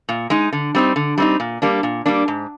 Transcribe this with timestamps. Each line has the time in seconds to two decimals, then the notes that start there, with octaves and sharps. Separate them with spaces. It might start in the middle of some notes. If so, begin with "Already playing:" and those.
0.09 A#2
0.30 G#3 D#4
0.52 D3
0.75 G3 C4 D#4
0.96 D3
1.18 G3 C4 D#4
1.40 A#2
1.62 G3 A#3 D4
1.83 A#2
2.06 G3 A#3 D4
2.28 G#2